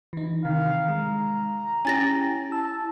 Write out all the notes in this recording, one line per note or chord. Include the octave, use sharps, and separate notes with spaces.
E3 D#4
C3 D#3 F5
G#3 A#5
C#4 E4 G4 G#5 A6 A#6
A5 E6